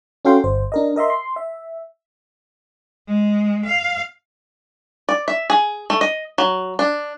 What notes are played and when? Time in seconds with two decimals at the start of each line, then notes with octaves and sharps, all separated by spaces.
0.25 C#4 F#4 A4 F5 G5 C6
0.44 G1 C5
0.72 D4 A#4 D#5
0.96 A#4 D#5 E5 C6
1.10 C6
1.36 E5
3.08 G#3
3.66 F5
5.09 D5
5.28 E5
5.50 G#4
5.90 A3
6.01 D#5
6.38 F#3
6.79 D4